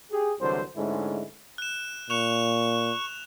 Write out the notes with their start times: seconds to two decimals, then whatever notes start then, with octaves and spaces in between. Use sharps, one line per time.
0.11 G4 G#4
0.40 C2 D3 E3 F#3 C5
0.76 G#2 D3 G#3 A3 C#4 E4
1.58 F#6 E7
2.10 A#2 C#6 F#6 E7 F7